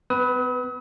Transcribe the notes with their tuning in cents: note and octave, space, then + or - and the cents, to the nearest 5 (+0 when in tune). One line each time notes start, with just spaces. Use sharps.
B3 +40 B4 +5 D#6 +45